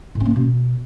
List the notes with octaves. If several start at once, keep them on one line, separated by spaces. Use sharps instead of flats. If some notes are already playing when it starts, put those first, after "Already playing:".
A2
C#4
A#3
C#4
B2